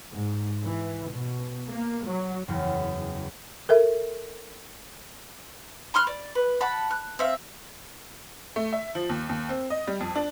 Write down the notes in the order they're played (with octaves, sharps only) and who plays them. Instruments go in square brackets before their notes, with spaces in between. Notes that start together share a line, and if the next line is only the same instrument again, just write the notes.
[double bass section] G#2
E3
B2
A#3
F#3
[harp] F#1 E2
[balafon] A4 A#4 E5
[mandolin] B5 C6 F6 F#6
D5
B4
F#5 A5 B5
F#6
C4 E5 F5
[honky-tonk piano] A3
E5
F3
D#2
D#2
C4
D#5
G3
F2
D4